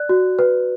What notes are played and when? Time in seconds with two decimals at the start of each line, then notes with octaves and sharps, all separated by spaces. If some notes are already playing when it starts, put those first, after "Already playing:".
Already playing: D5 F#6
0.09 F#4
0.39 B4